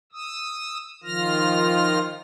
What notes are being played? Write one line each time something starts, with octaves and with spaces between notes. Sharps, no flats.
D#6 E6
D#3 F3 F4 F6 A#6